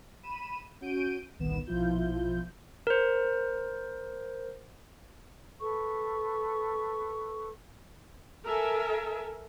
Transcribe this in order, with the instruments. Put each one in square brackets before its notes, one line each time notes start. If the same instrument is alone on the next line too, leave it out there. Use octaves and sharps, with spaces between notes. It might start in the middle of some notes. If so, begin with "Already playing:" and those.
[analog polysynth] B5 D#7 E7
C#4 F#4 G6 D7 D#7
G1 C2 A#2 D#3 B3 E7
A#1 B2 F3 E4 F4 G6
[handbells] A#4 C5
[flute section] A4 B4 C#6
[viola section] A4 A#4 E5 G#5